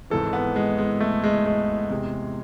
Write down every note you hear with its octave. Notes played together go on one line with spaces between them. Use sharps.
G#1 G#2 E3 A4
B3
G#3
G#3
A3
G#3
G#3
E2 C3 G#3